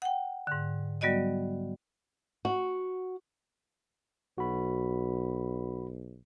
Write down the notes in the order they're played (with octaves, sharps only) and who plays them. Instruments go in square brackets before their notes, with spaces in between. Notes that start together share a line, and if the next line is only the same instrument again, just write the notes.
[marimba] F#5 G5
G#2 D3
F#3 G3 B3 F#4 D5 D#5
[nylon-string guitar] F#4
[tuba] B1 [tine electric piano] F#4 B5